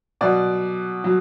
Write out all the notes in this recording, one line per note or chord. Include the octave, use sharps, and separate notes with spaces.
B2 F#3 D5
F#3